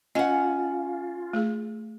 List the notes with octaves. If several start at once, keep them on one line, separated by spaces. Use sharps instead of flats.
C#4 F4 D#5 F#5 G#5
A3 G#4